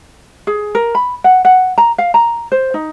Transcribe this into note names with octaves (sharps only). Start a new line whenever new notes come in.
G#4
A#4
B5
F#5
F#5
A#5
F5
A#5
C5
D#4